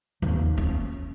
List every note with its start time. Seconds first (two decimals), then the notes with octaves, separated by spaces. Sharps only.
0.22 D#2 F3
0.58 C#4